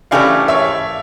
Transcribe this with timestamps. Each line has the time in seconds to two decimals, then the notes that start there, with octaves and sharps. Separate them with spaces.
0.11 E3 A3 C#4 G4 D5 F5
0.48 C#5 E5